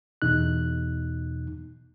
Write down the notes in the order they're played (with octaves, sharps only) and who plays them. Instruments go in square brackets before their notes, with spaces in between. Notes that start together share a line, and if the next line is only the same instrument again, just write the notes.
[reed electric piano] E2 B2 D#4 F#6